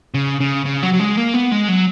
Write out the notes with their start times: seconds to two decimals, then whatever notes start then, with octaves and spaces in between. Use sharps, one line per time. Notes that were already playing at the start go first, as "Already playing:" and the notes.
0.14 C#3
0.40 C#3
0.66 C#3
0.83 F#3
0.93 F#3
1.00 G#3
1.17 A#3
1.34 B3
1.52 G#3
1.68 F#3